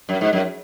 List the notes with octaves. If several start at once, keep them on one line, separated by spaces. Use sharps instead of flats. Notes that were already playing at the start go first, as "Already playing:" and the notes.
F#2
G#2
F#2